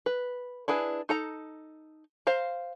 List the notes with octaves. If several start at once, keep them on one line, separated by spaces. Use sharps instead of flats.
B4
D4 E4 G#4 B4
D#4 A4 A#5
C5 F5 A#5